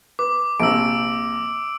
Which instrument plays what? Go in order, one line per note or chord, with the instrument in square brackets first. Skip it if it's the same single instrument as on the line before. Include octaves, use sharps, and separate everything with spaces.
[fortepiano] B4 [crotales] D6
[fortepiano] A#1 C3 [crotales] E6 D7